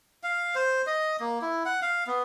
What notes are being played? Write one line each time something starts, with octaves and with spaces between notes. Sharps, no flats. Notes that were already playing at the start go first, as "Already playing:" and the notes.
F5
C5
D#5
A#3
E4
F#5
F5
B3